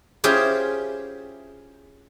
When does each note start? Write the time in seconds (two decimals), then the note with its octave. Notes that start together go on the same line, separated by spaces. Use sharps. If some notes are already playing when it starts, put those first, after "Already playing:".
0.24 C#4 E4 F4 G4 G#4 C5